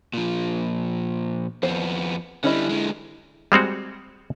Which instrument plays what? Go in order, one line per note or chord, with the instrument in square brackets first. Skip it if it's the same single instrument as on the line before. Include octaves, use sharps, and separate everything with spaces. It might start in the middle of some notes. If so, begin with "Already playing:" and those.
[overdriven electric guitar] A#2 F3
[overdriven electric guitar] F2 B3 [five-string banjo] C5
[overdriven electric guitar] D3 G3 [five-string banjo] C#4 E4 D#5
[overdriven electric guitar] D3 G#3
[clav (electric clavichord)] G3 G#3 C4 F#4